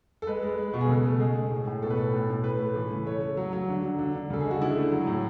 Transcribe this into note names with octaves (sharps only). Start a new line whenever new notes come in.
A4
G#3 B4
G#3
G#3
B2
G#4
C#3 A4
A3
G#3 G#4
G#3
A2
A2
B2 A4
B4
B2 A4
A2
A2
A3 B4
A3
E3
C#3
A3 C#5
A3
F#3
F#3
D3
F#3
D3
D3
C#3 A4
G#4
G#3
F#4
D3 E4
A3
F#3
A2